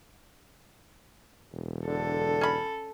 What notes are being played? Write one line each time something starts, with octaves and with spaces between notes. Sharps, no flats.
E1
D3 A4
C#4 B5